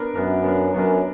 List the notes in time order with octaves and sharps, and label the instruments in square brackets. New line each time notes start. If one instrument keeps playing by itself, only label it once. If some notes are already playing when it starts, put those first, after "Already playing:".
Already playing: [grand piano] B3 D4 A#4
[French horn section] F#2 [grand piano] B3 D4 A#4
[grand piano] B3 D4 A#4
[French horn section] F#2 [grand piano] B3 D4 A#4